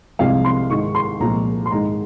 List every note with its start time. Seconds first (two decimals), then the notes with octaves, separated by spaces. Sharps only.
0.19 C2 C3 F3 G#3 F5
0.45 C6
0.70 G#2 D#3 G#3 C#6
0.95 C6
1.20 C2 A#2 F3 G#3 A#5
1.66 C6
1.71 G#2 D#3 G#3 A#5